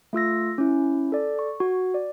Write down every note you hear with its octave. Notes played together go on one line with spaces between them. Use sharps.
A3 F4 E6 A#6
C#4 E4
A4 D5
C#6
F#4
D5